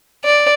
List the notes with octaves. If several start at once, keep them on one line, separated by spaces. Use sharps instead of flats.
D5